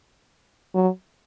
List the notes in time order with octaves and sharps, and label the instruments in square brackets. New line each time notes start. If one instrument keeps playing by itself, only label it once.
[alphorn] F#3